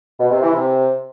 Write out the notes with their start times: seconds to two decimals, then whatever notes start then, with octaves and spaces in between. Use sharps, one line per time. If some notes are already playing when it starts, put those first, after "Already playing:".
0.19 B2
0.30 C3
0.41 E3
0.52 C3